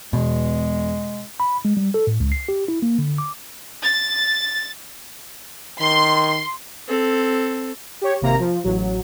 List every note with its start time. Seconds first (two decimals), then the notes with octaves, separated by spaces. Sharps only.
0.13 E2 B2 G#3
1.40 B5
1.65 G#3
1.77 G3
1.94 A4
2.07 A2
2.20 C#2
2.32 C7
2.49 G4
2.68 E4
2.82 A#3
2.98 D3
3.18 D6
3.83 A6
5.80 D#3 C6
6.88 C4 A4
8.01 G4 C#5
8.21 G#1 C3 A#3 A#5
8.40 F3
8.64 A1 F#3